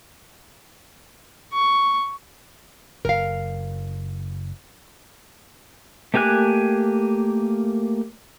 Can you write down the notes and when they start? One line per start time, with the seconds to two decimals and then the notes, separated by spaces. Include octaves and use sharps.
1.53 C#6
3.05 F#1 A#4 F5
6.14 A3 A#3 G4 G#5 F#6